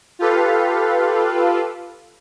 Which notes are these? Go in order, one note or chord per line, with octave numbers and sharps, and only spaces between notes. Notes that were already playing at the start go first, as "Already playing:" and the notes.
F4 G4 A4 B4 F5